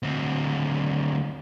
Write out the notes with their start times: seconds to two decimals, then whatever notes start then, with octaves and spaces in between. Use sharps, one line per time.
0.03 D2 C4